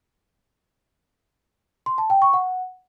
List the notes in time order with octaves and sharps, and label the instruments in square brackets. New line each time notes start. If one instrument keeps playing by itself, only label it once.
[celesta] C6
A5
G5
C#6
F#5